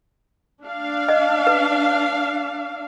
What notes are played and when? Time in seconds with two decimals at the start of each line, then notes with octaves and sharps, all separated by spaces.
0.63 D4 F5
1.09 D#5
1.47 B4